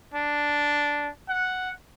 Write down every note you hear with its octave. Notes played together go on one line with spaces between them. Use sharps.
D4
F#5